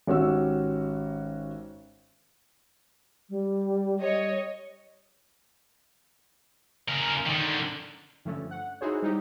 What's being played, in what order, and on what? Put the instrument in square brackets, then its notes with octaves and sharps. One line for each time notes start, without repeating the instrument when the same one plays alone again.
[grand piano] G#1 C#4 F#4 G4 E6
[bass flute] G3
[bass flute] G3 [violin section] C#5 D#5
[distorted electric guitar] C#3 A#4
D3 D#3
[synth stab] G2 D3 F3 A3 C#4
F#5
D#4 E4 F#4 G#4 C5 C#5
G3 D#4 E4 G4